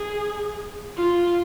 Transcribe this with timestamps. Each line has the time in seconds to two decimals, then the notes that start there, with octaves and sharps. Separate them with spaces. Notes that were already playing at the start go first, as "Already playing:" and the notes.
Already playing: G#4
0.97 F4